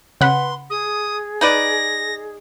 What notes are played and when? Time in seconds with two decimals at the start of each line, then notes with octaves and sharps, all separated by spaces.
0.21 C#3 B4 F#5 B5 C6
0.70 G#4 D#6
1.41 D#4 B4 D5 A#6